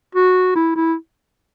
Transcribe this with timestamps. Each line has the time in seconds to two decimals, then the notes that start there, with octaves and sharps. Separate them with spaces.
0.15 F#4
0.56 E4
0.76 E4